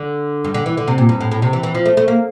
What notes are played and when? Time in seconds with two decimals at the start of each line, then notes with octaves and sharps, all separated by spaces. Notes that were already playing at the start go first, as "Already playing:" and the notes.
Already playing: D3
0.44 G2
0.54 D3
0.66 E3
0.77 D3
0.87 C3
0.98 A#2
1.09 G2
1.21 A2
1.31 A2
1.42 C3
1.53 E3
1.63 E3
1.75 F3
1.86 A3
1.97 A3
2.08 A#3